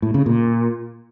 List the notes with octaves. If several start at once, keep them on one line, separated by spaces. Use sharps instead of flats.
A2
C#3
A#2